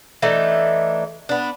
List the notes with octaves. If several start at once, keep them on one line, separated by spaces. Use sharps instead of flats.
E3 A3 D4 D#4
B3 D4